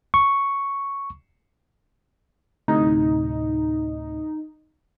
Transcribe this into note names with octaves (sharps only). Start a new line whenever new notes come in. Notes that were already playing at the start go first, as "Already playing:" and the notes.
C#6
D2 A2 C3 D#4